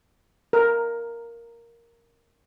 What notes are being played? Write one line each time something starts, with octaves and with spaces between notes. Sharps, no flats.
A#4